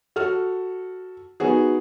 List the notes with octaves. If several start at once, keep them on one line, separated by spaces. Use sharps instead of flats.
F#4 A4 F6
D#3 B3 F#4 G#4